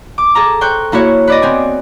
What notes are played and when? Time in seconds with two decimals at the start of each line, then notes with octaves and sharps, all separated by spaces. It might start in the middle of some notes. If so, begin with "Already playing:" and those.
0.18 D6
0.35 G#4 A4 A#5
0.61 C5 G5 C#6 F#6
0.92 A#3 E4 F#4 C#5
1.27 B4 D5 D#5
1.42 B3 C4 G#5